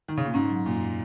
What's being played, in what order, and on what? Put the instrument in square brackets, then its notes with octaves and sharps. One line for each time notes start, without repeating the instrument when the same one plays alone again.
[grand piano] D#3
C#3
A#2
[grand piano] G#2 [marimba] C#4
[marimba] F#3
[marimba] F#2 [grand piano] A#2